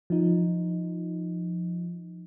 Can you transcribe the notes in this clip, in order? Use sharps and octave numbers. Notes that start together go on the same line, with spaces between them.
F3 D#4